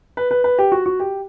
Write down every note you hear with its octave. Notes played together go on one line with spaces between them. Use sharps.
B4
B4
B4
G4
F#4
F#4
G4